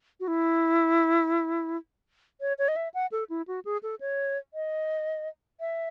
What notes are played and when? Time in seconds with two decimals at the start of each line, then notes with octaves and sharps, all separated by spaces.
0.20 F#4
0.28 E4
2.41 C#5
2.59 C#5
2.68 D#5
2.76 E5
2.94 F#5
3.12 A4
3.30 E4
3.47 F#4
3.65 G#4
3.83 A4
4.01 C#5
4.54 D#5
5.60 E5